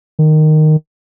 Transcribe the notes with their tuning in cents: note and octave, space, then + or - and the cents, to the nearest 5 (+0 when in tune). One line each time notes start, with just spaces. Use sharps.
D#3 -10